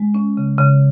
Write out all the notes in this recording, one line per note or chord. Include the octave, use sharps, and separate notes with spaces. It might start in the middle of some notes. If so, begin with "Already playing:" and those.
Already playing: G#3
C#4
C#3
C#3